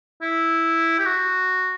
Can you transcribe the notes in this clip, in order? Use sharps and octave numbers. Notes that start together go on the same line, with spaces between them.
E4
G4
F#4